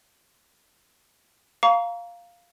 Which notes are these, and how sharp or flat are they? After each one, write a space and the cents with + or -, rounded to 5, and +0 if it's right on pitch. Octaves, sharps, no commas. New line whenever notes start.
F5 +0 A#5 +0 C#6 +45